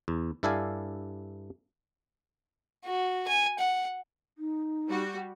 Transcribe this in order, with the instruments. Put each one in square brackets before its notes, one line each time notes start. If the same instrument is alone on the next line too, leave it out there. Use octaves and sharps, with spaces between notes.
[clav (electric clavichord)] E2
G2 E4 A4 D5 F5 G#5
[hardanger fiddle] F#4
G#5
F#5
[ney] D#4
[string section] G3 F#4